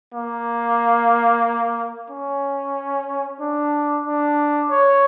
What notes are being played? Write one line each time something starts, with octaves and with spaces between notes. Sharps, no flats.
A#3
C#4
D4
D4
C#5